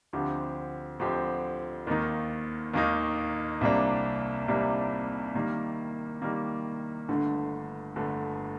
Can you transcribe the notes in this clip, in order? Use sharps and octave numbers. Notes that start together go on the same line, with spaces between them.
D2 D3 F3 C4 G4
D2 D3 F3 C4 G4
D#2 D#3 A#3 D#4
D#2 D#3 A#3 D#4
C2 C3 G3 A#3 D4
C2 C3 G3 A#3 D4
D#3 G3 A#3
D#3 G3 A#3
G1 G2 D3 A3
G1 G2 D3 A3